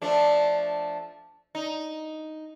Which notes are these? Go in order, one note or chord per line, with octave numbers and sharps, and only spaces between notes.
F3 A3 D4
D#4